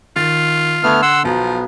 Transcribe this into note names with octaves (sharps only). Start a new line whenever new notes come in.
D#3 F4 A6
D3 A3 B3 F6 G#6
F#5 C6 E6
B1 F3 B3 A#5